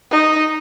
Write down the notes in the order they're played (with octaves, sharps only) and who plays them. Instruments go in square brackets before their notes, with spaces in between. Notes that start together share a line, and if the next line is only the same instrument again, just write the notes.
[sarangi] D#4